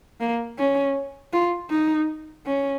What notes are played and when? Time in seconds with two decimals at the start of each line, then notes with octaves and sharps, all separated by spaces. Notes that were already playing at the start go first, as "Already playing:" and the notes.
0.21 A#3
0.58 C#4
1.33 F4
1.71 D#4
2.46 C#4